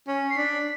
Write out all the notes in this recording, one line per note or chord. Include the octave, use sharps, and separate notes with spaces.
C#4
C7
D4 B6